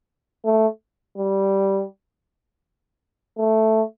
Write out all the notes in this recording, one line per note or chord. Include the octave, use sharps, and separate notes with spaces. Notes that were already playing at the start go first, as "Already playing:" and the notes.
A3
G3
A3